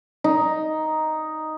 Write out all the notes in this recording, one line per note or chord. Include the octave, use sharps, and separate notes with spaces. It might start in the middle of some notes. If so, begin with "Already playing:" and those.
D#4